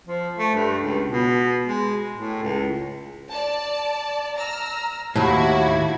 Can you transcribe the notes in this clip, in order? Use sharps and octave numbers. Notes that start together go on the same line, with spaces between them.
F3
A3
G2
C#2
B2
G#3
A2
C#2
D5 A5
A#5 E6 F6
D#2 A2 E4 F#4 G#6